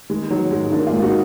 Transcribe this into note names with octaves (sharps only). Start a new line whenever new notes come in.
D#3 G#3
D#3 F#3
G#2 G#3
D#3 A#3 D4
F4 G#4
G#2
D#4 F#4